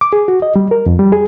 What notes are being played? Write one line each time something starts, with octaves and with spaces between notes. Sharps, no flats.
D6
G#4
F#4
D#5
G3
A#4
F2
G3
G#4